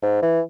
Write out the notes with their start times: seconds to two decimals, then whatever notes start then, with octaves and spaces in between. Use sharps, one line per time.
0.03 G#2
0.22 E3